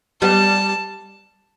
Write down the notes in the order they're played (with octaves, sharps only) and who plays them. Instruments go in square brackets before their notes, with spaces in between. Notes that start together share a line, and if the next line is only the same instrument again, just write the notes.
[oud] G3 B3 [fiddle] A5